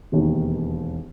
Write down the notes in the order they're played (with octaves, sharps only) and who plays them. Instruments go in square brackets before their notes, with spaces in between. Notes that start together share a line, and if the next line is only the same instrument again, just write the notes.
[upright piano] E1 D#2 D#3